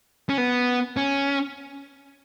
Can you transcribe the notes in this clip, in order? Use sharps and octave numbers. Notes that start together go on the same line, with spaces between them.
C#4
B3
C#4